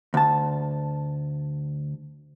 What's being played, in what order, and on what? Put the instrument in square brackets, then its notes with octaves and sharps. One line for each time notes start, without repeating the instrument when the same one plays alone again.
[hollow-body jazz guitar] D2 A5